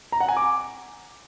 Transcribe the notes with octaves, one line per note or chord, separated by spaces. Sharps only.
A#5
F#5
G#5
D6